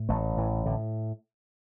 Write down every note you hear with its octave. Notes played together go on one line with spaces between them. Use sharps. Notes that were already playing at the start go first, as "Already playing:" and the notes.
Already playing: A2
A1 A3
A2 E3
A2 D3